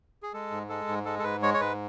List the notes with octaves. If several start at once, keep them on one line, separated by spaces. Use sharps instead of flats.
G#4
G#3 A4
G#2
G#3 A4
G#2
G#3 A4
A4
G#2 B4
G#3 C#5
C#5
G#2 B4